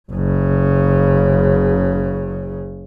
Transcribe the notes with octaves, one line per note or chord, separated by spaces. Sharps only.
F#1 C#3